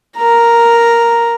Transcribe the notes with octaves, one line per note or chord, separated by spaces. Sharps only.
A#4 A#5